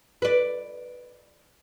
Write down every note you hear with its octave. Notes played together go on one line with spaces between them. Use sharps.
B4 D5